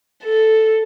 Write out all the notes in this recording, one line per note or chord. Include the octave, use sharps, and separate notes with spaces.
A4